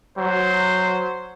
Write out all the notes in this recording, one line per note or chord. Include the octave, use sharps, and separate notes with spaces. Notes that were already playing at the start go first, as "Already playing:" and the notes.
F#3 C5